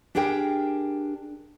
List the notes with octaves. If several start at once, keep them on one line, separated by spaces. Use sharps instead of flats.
D4 G4 G#4 A#4 G5